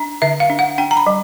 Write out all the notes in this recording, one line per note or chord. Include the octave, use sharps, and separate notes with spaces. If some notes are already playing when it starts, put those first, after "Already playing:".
Already playing: D4
D3 E5
F5
D4
F#5
D4 G5
A#5
B5
G3